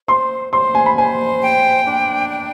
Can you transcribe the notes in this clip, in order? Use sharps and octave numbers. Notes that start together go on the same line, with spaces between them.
C5 C6
C5 C6
G#5
B5
C5 G#5
G5
D4
G5